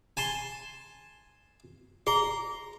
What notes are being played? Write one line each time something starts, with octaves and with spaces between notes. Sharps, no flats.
G#5 A5 C6
G#4 A#5 C6